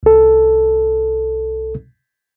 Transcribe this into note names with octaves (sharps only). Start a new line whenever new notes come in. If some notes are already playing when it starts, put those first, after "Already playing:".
C2 A4